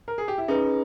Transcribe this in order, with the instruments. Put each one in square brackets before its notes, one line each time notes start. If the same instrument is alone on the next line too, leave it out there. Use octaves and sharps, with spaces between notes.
[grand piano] A#4
G#4
G4
E4
[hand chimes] C#4 G#4 B4 [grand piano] D#4